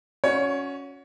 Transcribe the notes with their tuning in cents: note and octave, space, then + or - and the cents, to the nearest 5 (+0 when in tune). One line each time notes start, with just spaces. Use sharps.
C#4 +0 F#4 -20 C#5 +20